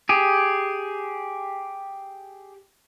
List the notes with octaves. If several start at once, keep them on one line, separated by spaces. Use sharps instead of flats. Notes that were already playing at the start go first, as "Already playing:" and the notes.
G4 G#4